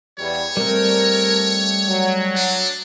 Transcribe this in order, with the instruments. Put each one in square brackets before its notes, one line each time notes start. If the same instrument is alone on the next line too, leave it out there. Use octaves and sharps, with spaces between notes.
[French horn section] E2 G3 [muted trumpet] C#5
[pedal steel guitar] G3 A3 C4 [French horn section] A#4
[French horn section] F#3
[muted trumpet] D4